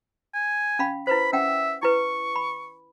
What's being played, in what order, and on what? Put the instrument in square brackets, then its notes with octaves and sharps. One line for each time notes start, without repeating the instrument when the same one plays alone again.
[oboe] G#5
[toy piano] C#4 F5 B5
[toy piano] E4 B4 C5 [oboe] B5
[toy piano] C#4 F#5 G5 [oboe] E5
[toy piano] E4 B4 [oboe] C#6
[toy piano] B5